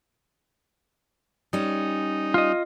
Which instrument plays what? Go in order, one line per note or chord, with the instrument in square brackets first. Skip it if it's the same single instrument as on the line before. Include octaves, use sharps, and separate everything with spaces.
[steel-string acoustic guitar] G3 C#4 [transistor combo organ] D#4
[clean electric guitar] F4 D#5